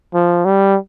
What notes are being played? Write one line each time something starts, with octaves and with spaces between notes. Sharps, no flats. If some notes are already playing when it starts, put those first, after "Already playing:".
F3
G3